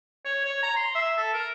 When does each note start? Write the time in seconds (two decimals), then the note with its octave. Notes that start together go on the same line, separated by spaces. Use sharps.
0.25 C#5
0.44 C#5
0.63 A#5
0.76 C6
0.95 E5
1.17 A4
1.33 A#4